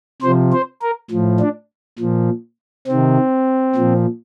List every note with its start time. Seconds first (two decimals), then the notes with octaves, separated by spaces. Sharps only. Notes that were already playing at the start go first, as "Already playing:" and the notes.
0.22 C3 F3 C5
0.52 C5
0.82 A#4
1.11 A2 F3
1.40 D4
1.99 A#2 F3
2.88 C3 D#3 C4
3.75 A#2 F3